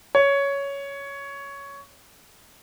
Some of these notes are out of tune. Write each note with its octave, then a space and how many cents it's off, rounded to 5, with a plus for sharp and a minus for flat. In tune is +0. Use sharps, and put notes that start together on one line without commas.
C#5 +10